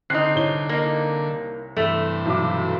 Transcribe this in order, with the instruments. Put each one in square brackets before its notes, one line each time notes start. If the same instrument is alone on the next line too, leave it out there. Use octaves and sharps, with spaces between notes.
[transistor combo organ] D3 [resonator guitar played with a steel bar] C4 D#4 [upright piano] F#6 C7
[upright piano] C2 C#5 G7
[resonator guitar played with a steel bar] A#3 D#4
[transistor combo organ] G2 C3 E3 [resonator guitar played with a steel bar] A3
[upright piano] B1 D6